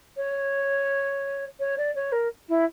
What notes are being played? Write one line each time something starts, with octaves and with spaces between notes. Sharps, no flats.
C#5
C#5
D5
C#5
A#4
E4